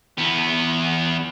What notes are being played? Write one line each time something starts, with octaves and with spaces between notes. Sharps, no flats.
E2 B3